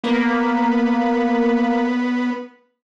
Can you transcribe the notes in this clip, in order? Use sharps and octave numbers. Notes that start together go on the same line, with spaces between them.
A#3 B3